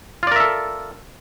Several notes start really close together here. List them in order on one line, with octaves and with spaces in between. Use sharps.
F4 D5 A#4 E5 A4